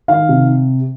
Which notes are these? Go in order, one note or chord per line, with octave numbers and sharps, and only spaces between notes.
D#3 F5
C3